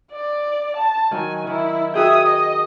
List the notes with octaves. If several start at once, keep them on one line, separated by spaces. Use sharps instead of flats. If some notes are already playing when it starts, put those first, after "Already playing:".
D5
A5
D#3 F#3 G#5
D#3 E4
F#4 G#4 E5 G5 D#6
D#5